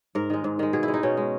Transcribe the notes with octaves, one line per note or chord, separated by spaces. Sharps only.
G#2 A#4
D#3 G#3
G#2
D#3 G#3
B2 G#4
E4
G#3
D#4
B2 C#4
G#3